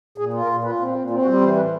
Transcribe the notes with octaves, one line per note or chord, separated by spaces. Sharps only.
A#2 G#4
F4
A#4
A#2
F4 B4
C4
F4
A#2
C4 F4
F#4
G3
G4
E3 C5
A2 B4